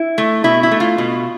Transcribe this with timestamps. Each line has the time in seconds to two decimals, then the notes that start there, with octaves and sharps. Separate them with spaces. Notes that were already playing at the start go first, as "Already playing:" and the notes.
Already playing: E4
0.18 A3
0.44 B2 E4
0.63 E4
0.71 A3
0.80 F4
0.98 B2